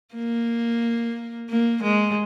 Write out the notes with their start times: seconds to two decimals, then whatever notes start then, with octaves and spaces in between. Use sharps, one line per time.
0.15 A#3
1.50 A#3
1.83 G#3